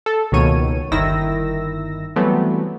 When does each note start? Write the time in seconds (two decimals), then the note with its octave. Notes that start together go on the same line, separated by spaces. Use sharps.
0.06 A4
0.32 C#2 B2 D#3 A#3 C#5 D#7
0.92 G1 D#3 E4 E6 A#6
2.16 E3 F#3 G3 A3 B3 C4